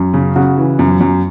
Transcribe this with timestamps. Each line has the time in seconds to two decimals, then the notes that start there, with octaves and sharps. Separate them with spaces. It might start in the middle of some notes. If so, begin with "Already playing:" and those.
Already playing: F#2
0.14 C#3
0.36 C#3 F#4
0.58 E3
0.79 F#2
1.00 F#2